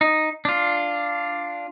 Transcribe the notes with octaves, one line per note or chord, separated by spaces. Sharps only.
D#4
D4 F4